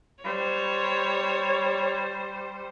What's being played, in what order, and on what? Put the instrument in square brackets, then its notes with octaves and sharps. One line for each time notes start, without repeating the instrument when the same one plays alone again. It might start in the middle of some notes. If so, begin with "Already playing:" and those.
[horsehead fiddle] G3 C5 [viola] C#5